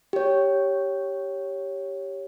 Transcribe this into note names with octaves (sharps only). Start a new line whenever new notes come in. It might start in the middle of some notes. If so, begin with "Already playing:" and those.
G4 C#5